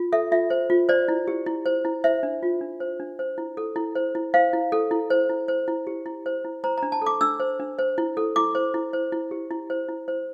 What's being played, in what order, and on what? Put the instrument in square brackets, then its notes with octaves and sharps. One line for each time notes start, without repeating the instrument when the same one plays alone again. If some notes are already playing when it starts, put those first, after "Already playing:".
Already playing: [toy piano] F4
A4 E5
F4 E5
C5
F4
C5 D5
E4
G4
E4
C5
E4
C5 E5
D4
F4
D4
C5
D4
C5
E4
A4
E4
C5
E4
C5 F5
E4
A4
E4
C5
E4
C5
E4
G4
E4
C5
E4
C5 A#5
A#5
D4
A5
A4 D6
D4 E6
C5
D4
C5
E4
A4
E4 D6
C5
E4
C5
E4
G4
E4
C5
E4
C5